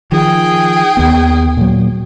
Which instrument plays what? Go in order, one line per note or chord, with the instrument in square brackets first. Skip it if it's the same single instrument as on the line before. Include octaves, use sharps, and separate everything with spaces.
[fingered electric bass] D#3 F3 [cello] G#4 G5
[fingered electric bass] D#2 B3
A#2 F#3